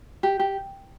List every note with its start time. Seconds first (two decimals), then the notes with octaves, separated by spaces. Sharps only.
0.23 G4
0.39 G4